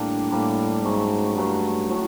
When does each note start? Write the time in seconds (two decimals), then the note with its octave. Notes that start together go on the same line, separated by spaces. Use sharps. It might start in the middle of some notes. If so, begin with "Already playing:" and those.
Already playing: A2 D3 G3 A#3 D4
0.31 A2 D3 G3 A#3 D4
0.84 G#2 C#3 F#3 A3
1.37 G2 C#3 F#3 A3
1.90 A2 F#3 A3